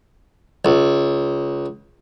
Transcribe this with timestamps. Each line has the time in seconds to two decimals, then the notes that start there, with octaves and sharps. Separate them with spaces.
0.65 C#2